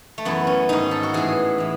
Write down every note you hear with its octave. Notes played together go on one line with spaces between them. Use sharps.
A3
F#2 E3 B3
C#4
G#2 D#3 D#4
A4
F#4
A2 E3 G#4
A2 E3